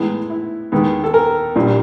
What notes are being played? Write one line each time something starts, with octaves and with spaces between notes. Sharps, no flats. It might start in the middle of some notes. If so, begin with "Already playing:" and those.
Already playing: A2 E3 G#3 B3
E4
D#2 D#3 G#3 B3
A4
A#4
A#1 A#2 G3